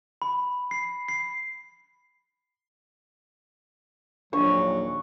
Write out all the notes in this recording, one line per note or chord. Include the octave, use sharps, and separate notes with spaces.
B5
C7
C7
A#1 D#2 F#3 D4 C#6